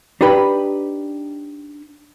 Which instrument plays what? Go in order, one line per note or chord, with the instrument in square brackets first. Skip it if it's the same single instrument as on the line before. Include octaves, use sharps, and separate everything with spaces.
[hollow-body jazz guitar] D4 D#4 G4 B4 B5